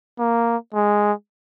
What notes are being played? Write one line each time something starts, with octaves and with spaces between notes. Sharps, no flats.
A#3
G#3